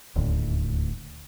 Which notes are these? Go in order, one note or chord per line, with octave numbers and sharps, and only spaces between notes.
D#1 D2 A2